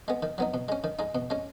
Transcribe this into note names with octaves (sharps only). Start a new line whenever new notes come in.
G#3 B3
D#3
F#3 B3 D#4
B2
G#3 C#4
D#3
G#3 D#4
B2
G#3 C#4